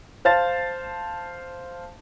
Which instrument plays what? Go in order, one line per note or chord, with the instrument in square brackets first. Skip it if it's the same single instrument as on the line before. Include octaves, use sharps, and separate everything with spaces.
[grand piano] C5 F5 A5 A6